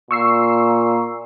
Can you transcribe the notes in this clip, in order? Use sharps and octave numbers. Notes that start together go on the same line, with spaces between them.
A#2 C#6 E6 C7